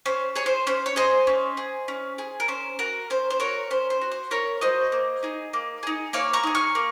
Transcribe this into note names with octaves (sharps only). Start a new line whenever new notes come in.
C#4 C5
G#4 C#5
C5
C#4 C5
C#5
G#4 C5 D#5
C#4
G#4
C#4
G#4
A#4
C#4 C5
F#4 A#4
C#4 C5
C5
F#4 A#4 C#5
C#4 C5
C5
F#4
C5
C#4 A#4 C#5
F#4 C5 D#5
A#3
D#4 G#4
A#3
D#4 G#4
A#3 C#5 F5
A#5 C#6
D#4 G#4
C#6 F6
A#3